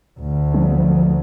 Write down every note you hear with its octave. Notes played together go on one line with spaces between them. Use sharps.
D2
F3